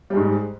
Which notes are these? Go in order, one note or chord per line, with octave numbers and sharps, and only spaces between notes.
G#2 G3 G#3